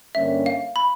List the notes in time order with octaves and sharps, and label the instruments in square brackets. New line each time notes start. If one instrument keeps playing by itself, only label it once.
[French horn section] G2 D3 G3 A#3 C#4 [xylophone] E5
[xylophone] F5
B5